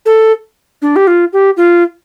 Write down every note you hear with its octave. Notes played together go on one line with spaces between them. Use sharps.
A4
D4
G4
F4
G4
F4